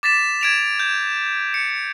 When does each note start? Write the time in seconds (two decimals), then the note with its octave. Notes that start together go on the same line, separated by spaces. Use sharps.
0.03 D6 A6 B6 E7
0.41 G#6 D7 F7
0.80 G6
1.54 C#7